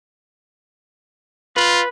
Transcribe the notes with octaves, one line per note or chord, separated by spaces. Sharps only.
F4 B4